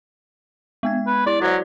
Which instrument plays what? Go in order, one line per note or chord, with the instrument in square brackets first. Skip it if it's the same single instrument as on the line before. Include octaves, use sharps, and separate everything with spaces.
[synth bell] G#3 B3 G#6
[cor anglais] B4
[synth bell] E4 [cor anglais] D5
[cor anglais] F#3 [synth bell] F#4 C5 D5